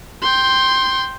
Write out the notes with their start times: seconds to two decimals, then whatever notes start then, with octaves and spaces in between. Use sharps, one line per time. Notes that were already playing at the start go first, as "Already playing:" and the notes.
0.22 G5 C6